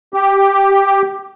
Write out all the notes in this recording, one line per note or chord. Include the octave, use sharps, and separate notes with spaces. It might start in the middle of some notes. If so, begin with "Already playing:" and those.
G4